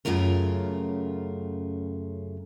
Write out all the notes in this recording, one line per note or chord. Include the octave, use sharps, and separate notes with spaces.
F#2 C#3 A3 F4 A#4